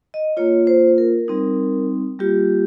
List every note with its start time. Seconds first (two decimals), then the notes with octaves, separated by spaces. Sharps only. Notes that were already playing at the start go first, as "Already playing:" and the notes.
0.14 D#5
0.37 A#3 F4 C#5
0.67 C5
0.98 A#4
1.28 G3 C4 D#4
2.19 G3 A#3 F4 G4